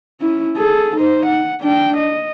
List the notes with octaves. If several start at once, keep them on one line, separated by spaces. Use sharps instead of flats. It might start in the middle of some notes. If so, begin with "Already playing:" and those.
C#4 E4
G#4 A4
D#4 C5
F#5
D4 G5
D#5